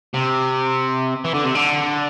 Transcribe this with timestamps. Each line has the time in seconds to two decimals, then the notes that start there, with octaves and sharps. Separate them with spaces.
0.14 C3
1.25 E3
1.34 D3
1.44 C3
1.55 D3